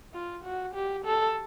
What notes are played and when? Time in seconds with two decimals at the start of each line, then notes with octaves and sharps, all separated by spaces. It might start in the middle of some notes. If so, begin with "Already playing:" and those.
0.14 F4
0.44 F#4
0.75 G4
1.05 A4